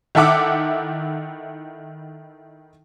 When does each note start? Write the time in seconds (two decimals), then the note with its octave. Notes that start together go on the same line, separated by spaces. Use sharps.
0.15 D#3 E4 A4 E5 F#5 D6